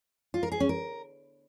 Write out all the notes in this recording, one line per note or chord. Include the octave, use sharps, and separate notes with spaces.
F4
A#4
G#4
C#4
A#4